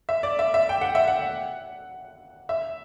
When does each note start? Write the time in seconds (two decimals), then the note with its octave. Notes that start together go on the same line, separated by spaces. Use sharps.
0.09 E5
0.23 D5
0.39 E5
0.54 E5
0.69 G5
0.81 F#5
0.95 E5
1.07 F#5
2.49 E5